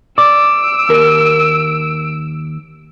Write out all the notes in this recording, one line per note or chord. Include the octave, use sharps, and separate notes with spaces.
D5 D6 E6 D7
D#2 A#4